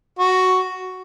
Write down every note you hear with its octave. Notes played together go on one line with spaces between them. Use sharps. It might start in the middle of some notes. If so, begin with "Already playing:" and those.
F#4